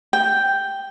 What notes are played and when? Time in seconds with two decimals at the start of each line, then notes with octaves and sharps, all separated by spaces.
0.13 G5